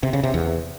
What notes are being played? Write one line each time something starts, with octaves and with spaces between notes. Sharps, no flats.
C3
C#3
C3
E2